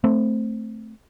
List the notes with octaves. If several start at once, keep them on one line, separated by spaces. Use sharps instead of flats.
A3 C4